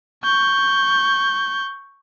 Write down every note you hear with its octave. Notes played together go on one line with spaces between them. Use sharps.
C#6 G6